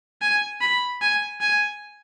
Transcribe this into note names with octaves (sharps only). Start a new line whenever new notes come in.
G#5
B5
G#5
G#5